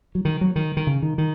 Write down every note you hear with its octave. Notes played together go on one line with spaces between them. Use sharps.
F#3
D#3
F#3
D#3
D#3
C#3
D#3
D#3